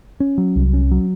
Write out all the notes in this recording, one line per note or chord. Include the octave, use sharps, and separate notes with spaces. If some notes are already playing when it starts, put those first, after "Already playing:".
C#4
F#3
C2
C#4
F#3